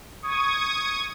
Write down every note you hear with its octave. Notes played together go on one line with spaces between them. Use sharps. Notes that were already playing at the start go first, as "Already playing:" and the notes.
C#6 D#6 G#6